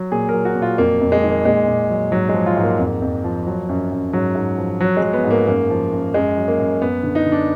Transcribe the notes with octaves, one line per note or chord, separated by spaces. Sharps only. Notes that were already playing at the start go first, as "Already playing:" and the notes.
Already playing: F#3
A#2 G#4
F#3 A#4
F#4
A#2
F4
F2 A#3
F2
G#3
D#3
A#3
A#2 G#3
A#2
F#3
G#2 F#3
G#3
F3
F4
G#2
A#3
F2
F2
F3
F#3
F#2
F#2
G#2 F#3
G#2
F3
F#3
G#3
F#3
B3
G#2
A#3
F#2 A#3
F3
F#2
F#2 G#3
F#3
A#3
F#2
F#2 B3
D3
D#4
D3
D4